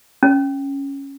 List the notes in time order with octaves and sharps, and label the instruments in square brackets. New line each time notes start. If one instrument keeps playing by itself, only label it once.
[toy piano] C#4